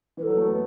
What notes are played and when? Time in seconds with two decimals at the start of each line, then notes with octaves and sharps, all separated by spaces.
0.17 E3 B4
0.22 F#3 A4
0.37 A3
0.47 B3